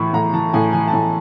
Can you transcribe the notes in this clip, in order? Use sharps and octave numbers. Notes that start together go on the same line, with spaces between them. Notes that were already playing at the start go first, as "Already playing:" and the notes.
Already playing: A2 E3 B5 C#6
A2 A#5
E3 A5
A2 G#5
E3 G#5
A5
A2 G#5